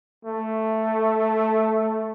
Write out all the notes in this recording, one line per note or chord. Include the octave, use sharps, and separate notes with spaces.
A3